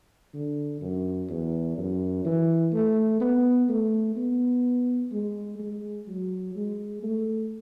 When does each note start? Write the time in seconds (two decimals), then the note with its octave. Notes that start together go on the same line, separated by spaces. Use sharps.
0.34 D3
0.81 F#2
1.30 E2
1.78 F#2
2.25 E3
2.73 A3
3.21 B3
3.69 A3
4.16 B3
5.12 G#3
5.59 G#3
6.08 F#3
6.55 G#3
7.03 A3